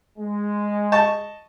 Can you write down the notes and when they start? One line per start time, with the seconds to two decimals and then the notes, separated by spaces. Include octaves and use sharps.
0.18 G#3
0.92 D#5 A5 C#6